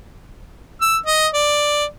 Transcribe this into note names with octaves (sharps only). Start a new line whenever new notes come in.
E6
D#5
D5